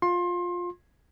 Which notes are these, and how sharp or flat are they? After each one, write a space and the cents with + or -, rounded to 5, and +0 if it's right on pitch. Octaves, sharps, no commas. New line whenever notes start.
F4 +15 C6 +25